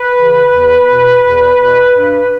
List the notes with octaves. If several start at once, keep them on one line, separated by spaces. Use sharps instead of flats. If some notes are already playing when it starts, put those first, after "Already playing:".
Already playing: B4
C#3 E3
E2
B2
E2
B2
G2